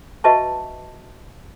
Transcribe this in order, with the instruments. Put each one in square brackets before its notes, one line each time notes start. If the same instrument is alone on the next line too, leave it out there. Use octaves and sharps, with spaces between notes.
[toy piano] F#4 B4 D#5 E5 A5 C#6